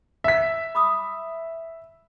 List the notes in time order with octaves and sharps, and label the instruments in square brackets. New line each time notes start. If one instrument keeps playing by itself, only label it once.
[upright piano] E5 B6
[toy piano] B5 D6 D#6